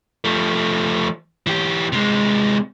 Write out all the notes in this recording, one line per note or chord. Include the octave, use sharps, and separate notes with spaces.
F3 A3
E3 G4
C3 G#3